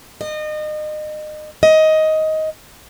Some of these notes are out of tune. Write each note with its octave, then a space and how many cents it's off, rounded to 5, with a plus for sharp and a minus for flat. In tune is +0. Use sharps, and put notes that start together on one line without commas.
D#5 -30
D#5 +15